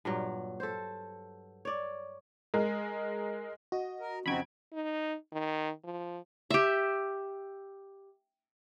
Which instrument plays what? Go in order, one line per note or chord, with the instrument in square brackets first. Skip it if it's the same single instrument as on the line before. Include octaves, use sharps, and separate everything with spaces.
[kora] G2 A#2 F#3
A4 C5
C#5 D5
[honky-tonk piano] G#3 A#4
[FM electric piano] F#4 [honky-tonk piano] D#5
[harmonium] A#4
[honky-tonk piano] F2 C#3 D7 [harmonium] C4 D#4 F#4 [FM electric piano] B5 G#6
[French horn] D#4
D#3
F3
[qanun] G4 E5